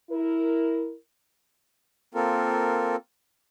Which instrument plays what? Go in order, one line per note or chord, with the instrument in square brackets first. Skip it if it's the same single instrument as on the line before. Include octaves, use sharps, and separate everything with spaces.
[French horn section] E4 A#4
[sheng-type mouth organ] A#3 C4 F4 A4 A#4